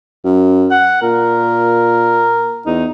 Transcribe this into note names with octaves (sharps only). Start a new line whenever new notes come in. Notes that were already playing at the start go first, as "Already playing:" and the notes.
F#2
F#5
A#2 A#4
E2 D#4